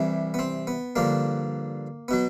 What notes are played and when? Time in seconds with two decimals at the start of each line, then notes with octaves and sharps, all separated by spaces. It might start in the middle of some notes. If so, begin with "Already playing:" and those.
Already playing: C2 C3 E3 G3
0.34 B3
0.39 C4
0.67 B3
0.96 G2 D3 F3 A#3
2.08 B2 F#3 B3